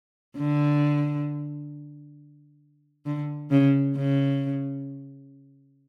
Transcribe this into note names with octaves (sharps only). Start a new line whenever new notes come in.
D3
D3
C#3
C#3